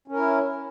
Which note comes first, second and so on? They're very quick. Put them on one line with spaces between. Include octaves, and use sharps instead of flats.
C#4 A#4 E4